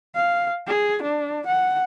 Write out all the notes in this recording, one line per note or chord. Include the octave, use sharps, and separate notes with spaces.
F5
G#4
D4
F#5